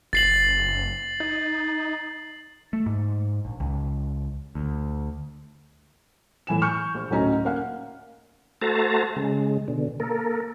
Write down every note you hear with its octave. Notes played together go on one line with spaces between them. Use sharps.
F#1 A6 C7 F#7
D#4
A3
G#2
A#1
C#2
D2
A2 E3 G#5 E7
G#5 C#6 F6 G6 C#7
A#1
D2 A2 F#3 C#4 D#4 A#5
A#3 C#4 F5 F#5
A3 F#4 A4 C5 A5 A#5
C#3 G#3
B2 D3
A#3 A4 A#4